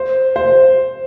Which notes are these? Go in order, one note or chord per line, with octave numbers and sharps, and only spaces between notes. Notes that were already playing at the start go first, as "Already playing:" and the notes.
Already playing: C5
C5